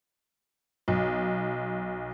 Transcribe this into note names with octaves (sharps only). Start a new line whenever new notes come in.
B1